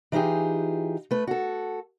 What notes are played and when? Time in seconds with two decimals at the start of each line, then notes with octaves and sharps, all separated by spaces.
0.12 E3 D#4 F4 G4 G#4
1.11 A3 B4
1.27 F#4 A4